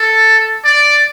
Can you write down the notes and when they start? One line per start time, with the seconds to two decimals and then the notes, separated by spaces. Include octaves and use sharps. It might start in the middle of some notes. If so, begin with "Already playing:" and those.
Already playing: A4
0.64 D5